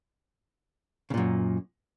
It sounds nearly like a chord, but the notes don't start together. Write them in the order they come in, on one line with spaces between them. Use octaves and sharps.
C#3 A#2 F#2